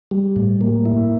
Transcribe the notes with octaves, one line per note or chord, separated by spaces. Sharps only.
G3
A2
A#3
E4